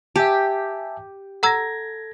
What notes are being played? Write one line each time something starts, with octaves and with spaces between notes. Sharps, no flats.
G4 E5 G#5 A5
A4 F#5 A#5 E6 G#6 A#6